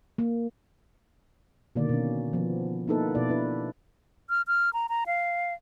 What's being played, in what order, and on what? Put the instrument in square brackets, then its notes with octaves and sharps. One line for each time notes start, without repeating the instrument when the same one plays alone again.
[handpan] A#3
B2 D3 D#3 A#3 D5
B2 C#4
F3 B3
A#3 B3 D#4 E4 A4 B4
B2 E4 D5
D4 E4 B4
[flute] F6
F6
A#5
A#5
F5